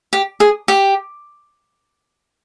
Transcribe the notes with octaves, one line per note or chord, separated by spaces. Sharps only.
G4
G#4
G4